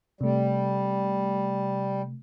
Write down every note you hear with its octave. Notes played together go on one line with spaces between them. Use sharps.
C3 G3 A3